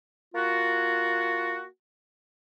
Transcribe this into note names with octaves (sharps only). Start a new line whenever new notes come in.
A#3 F4 F#4